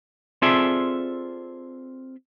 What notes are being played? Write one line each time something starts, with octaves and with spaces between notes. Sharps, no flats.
C4 F4 G#4 A4 D5 E5